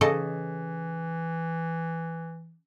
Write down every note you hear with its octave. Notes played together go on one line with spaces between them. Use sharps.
C#3 E3 A4 D#5